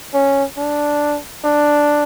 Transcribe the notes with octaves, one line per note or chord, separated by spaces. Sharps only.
C#4
D4
D4